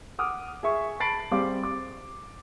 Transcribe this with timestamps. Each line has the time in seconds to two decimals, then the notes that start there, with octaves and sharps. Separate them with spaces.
0.19 F#5 D6 D#6 F6
0.63 G#4 E5 C#6
1.00 A5 B5 A6 C7 D7 F#7
1.31 G3 C4 G#4 F5 D6
1.63 D6